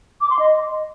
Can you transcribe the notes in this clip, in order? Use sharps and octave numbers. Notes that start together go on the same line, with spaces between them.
D6
C6
D#5